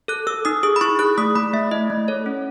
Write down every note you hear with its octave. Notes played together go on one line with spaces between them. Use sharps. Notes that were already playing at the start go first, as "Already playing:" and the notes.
A4 F#6
A4 E6
D#4 D#6
G#4 D#6
B5
E4 C#6
G#4 F#6
A3 D#6
A3 B5
A3 E5
E4 D#5
A3
A4 C#5
C#4